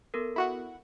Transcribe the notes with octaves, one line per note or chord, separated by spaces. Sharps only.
B3 A4 A#4
E4 F#4 F#5